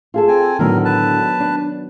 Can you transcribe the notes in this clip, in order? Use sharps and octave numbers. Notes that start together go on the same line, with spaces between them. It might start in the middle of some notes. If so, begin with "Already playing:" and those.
F4 G#4 A4
C4 G#5
A2 D3 D#3 F#3 B3 A#4
B4 A5
D4